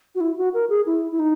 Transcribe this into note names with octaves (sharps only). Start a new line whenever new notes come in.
F#4
E4
F#4
A#4
G#4
E4
E4
D#4